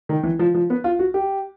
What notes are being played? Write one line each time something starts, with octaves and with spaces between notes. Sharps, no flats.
D#3
E3
F3
F3
B3
F4
F#4
G4